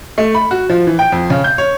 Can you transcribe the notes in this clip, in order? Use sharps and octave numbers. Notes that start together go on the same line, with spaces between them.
A3
B5
F#4
F3
E3
G5
F2
C#3
G6
C#5